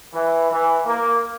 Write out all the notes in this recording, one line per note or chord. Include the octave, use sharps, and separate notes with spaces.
E3
E3
A#3